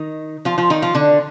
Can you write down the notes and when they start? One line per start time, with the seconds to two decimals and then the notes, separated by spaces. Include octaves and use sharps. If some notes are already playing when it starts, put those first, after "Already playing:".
Already playing: D#3 D#4
0.45 F3 F4
0.58 F3 F4
0.70 D#3 D#4
0.82 F3 F4
0.95 D3 D4